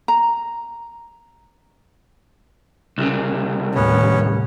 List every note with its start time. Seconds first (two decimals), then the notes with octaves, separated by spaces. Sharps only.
0.08 A#5
2.98 C2 C#3
3.75 D#2 A2 B3 C#4